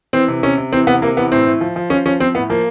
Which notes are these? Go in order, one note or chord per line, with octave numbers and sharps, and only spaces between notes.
E3 C4
C3
C3 C#4
C3
E3 C4
C3 B3
C3 A#3
E3 B3
A2 C4
A2
F3
F3
F3 C#4
F3 C#4
F3 C4
A2 B3
F3 A#3